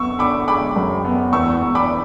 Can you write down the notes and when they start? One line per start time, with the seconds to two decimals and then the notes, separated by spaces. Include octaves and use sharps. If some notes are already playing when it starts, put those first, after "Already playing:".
Already playing: F#2 B3 C#6 E6
0.19 D3 B5 D6
0.48 G#3 B5 D6
0.76 F#2
1.05 B3
1.33 E2 C#6 E6
1.61 E2
1.75 B5 D6